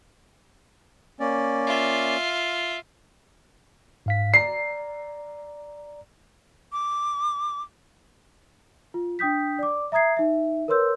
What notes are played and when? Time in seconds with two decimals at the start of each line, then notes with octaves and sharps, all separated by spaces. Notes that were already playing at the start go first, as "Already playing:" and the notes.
1.20 A#3 C#4 D5
1.67 F4 E5
4.06 G#2 F5 B6
4.34 D5 A#5 C7
6.72 D6
8.94 F4
9.19 D4 G5 D#6 G6 B6
9.59 D5 D6
9.92 E5 A#5 D#6 G#6 C7
10.17 D#4 E5
10.68 A#4 B4 C#5 C6 E6 G6